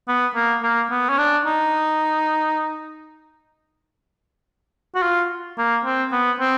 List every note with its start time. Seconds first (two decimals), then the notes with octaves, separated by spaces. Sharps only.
0.08 B3
0.35 A#3
0.63 A#3
0.91 B3
1.09 C#4
1.18 D4
1.45 D#4
4.95 F#4
5.02 F4
5.58 A#3
5.85 C4
6.12 B3
6.40 C4